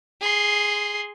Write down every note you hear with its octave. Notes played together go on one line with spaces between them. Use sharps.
G#4 C6